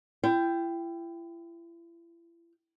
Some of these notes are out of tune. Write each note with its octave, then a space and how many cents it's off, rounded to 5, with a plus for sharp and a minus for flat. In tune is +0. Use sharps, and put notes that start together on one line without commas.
E4 +40 G5 +0